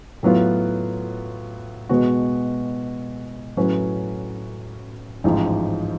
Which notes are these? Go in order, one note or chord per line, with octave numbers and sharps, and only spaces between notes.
A2 F#3 B3 F4
B2 G#3 B3 F#4
A2 F#3 C#4 F#4 B4
A1 G#2 F3